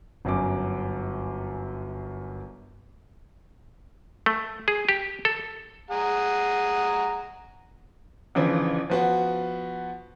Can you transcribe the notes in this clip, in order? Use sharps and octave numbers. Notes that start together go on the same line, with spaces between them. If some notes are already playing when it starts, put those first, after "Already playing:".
G1 F#2 G#5 D6
A3
G#4
G4
A4
G#4 F#5 A#5
G1 C#3 E3 F3
F3 B3 F#4